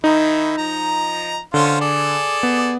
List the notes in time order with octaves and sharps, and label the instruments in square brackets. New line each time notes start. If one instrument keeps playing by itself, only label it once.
[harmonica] D#3 E4 [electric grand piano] D#4
[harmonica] F3 A#5
[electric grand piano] D3 [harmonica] C#4 F4 C5
[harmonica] G#4 A4 D5
[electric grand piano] B3